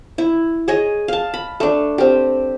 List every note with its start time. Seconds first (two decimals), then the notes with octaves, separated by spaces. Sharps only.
0.18 E4
0.68 G#4 C#5 D#5
1.08 F5 A5
1.34 B5
1.60 A3 D4
1.98 C4 G4